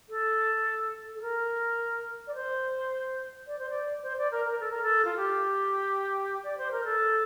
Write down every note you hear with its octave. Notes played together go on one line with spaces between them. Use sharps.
A4
A4
A#4
D5
C5
D5
C5
D5
C5
D5
A#4
A#4
A4
A#4
A4
F4
G4
D5
C5
A#4
A4